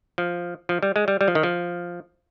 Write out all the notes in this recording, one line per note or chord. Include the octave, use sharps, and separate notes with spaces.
F3
F3
G3
G#3
G3
G3
F3
D#3
F3